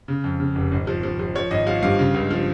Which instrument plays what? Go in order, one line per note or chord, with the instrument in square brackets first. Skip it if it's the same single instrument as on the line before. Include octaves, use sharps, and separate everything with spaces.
[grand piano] C#3
F2
C#3
F1
G#1
F3
F3
F3
F3 C#5
G#1 D#5
F3 F5
G2 F5
C#3
C#2
F3